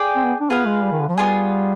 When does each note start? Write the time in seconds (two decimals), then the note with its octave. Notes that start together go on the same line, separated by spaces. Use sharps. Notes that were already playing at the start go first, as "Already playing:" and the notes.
Already playing: G#4 D5 G5
0.16 C4
0.24 B3
0.41 D4
0.50 B3 F4 G#4 B4 F5
0.66 G#3
0.84 G3
0.92 D#3
1.00 D3
1.09 F3
1.17 G3 B3 F4 G#4